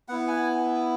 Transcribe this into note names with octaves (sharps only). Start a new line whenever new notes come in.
B3 E4 F#5
G#5